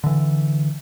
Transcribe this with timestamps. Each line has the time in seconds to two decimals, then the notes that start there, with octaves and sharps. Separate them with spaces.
0.04 D3 E3